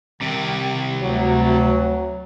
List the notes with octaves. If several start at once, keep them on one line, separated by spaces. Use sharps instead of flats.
C2 C3 D#3
D2 F#3